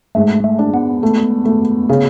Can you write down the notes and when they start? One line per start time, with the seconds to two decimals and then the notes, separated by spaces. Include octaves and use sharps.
0.15 G#2 A3
0.44 A3
0.59 D4
0.74 B3
1.03 A3
1.45 A3
1.89 C#3